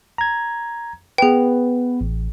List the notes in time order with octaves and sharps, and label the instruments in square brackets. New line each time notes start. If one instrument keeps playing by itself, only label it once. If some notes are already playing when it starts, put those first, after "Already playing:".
[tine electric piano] A#5 G#6
[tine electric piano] B3 B4 [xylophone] G#4 G5
[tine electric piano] A1